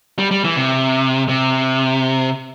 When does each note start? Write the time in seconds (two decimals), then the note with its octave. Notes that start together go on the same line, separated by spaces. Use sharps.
0.19 G3
0.31 G3
0.44 E3
0.56 C3
1.29 C3